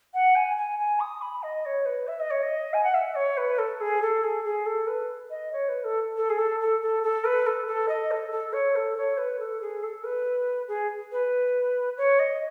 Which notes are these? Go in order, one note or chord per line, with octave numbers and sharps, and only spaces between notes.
F#5
G#5
G#5
G#5
D#6
B5
D#5
C#5
B4
E5
D#5
C#5
D#5
G#5
F#5
E5
C#5
B4
A4
G#4
A4
G#4
G#4
A4
B4
D#5
C#5
B4
A4
A4
G#4
A4
A4
A4
A4
B4
A4
A4
D#5
A4
A4
C#5
A4
C#5
B4
A4
G#4
A4
B4
G#4
B4
C#5
D#5